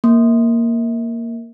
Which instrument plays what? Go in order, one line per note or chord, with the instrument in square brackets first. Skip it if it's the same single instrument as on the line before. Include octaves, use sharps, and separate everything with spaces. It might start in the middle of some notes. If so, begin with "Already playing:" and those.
[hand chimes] A#3